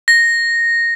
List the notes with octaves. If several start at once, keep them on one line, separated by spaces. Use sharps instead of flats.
A#6